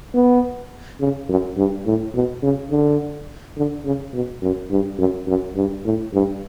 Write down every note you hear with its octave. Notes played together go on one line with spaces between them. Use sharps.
B3
C#3
F#2
G2
A2
B2
C#3
D3
D3
C#3
B2
F#2
G2
F#2
F#2
G2
A2
G2